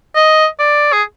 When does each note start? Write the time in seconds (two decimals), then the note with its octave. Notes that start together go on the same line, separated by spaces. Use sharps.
0.16 D#5
0.59 D5
0.93 G#4